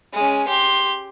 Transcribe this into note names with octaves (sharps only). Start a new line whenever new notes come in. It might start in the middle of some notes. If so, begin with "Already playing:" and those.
G#3 C#4
G4 C6